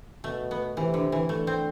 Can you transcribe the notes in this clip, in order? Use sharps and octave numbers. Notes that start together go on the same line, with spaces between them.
B2 A3
B3
C3 E3
D3
E3
D3 A3
C4